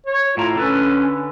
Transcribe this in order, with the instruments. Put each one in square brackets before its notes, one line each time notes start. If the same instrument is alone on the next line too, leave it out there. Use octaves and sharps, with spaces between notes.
[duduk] C#5
[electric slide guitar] A2 A#5 [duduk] F4
[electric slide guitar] D3 A4 B4 [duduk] C#4